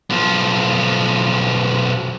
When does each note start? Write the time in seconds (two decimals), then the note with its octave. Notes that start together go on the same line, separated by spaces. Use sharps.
0.10 B1 F3